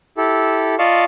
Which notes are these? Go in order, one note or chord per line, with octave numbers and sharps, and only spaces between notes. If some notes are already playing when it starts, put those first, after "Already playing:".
E4 G4 A4
F4 D5 D#5 F5 A5 C#6